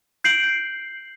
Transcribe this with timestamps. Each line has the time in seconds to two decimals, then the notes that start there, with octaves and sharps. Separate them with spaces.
0.24 G6 C7 D7 F#7